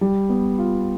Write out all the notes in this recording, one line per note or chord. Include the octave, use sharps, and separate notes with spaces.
G3
B3
F4